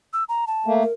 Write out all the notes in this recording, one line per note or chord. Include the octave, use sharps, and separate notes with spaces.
E6
A#5
A5
A3 A#3
A#4